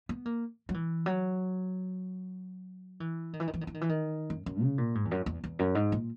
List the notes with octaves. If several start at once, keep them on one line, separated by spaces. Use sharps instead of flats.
B3
A#3
F#3
E3
F#3
E3
D#3
E3
D#3
E3
D#3
E3
D#3
E3
D#3
F#2
F#2
C#3
A#2
G#2
E2
F#2
E2
E2
F#2
G#2
A#2